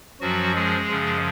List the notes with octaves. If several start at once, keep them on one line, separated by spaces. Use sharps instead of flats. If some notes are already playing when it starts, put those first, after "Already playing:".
F#2 F3 F#3 F#4
G#3 G#4
F#2 C#3 F3